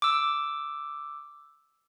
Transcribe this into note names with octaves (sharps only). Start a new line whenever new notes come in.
D6 E6